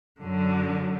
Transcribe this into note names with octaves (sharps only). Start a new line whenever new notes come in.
F#2 D3 F#3